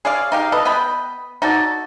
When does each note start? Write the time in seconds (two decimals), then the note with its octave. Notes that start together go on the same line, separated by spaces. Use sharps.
0.05 G#4 C#5 D5 F5
0.32 D#4 G4 F5
0.52 A4 B4 D#5
0.65 B3 D#5 G5 B5
1.42 D#4 F#4 A4 D5